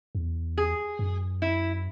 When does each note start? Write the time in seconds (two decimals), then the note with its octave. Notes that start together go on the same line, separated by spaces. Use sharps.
0.15 E2
0.58 G#4
0.99 F#2
1.42 E4